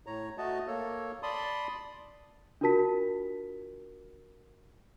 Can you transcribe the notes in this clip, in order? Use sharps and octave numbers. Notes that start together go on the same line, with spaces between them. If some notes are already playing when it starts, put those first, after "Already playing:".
A2 C#5 A#5
A3 F#4 D#5 A5
A#3 A4 C#5
D5 A5 B5 C6 D#6
D4 F4 F#4 A#4 A5 B6